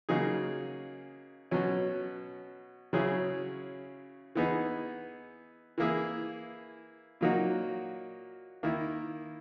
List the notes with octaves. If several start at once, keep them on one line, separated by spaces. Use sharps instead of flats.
C#3 F#3 A#3 D#4 G#4
B2 F#3 C#4
C#3 F#3 C#4 E4 G#4
E3 B3 D#4 G#4
E3 A#3 E4 G#4
A#2 F#3 A#3 D#4 F#4
D#3 A#3 E4